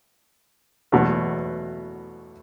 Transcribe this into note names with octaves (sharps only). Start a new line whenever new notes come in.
E2 B2 F#3 A3